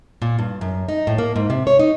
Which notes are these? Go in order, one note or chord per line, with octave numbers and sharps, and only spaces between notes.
A#2
G2
F#2
D#4
A2
A#3
G#2
C3
C#5
D#4